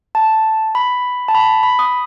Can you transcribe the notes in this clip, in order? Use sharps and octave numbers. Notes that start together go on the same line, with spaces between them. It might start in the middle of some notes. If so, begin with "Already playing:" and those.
A5
B5
A5
B5
B5
D#6